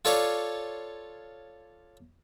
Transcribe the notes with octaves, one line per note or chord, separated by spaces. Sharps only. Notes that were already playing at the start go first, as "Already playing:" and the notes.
F4 A4 C#5 D5 F5